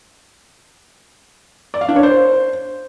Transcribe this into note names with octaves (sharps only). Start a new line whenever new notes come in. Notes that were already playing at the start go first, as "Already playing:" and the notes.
D5
F5
D4
C#5
C5